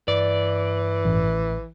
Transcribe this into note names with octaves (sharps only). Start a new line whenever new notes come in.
G2 E3 D5
A1